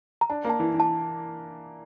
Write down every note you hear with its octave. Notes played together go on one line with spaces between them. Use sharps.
A#5
D4 A5
A#3
A5
E3
E3
A5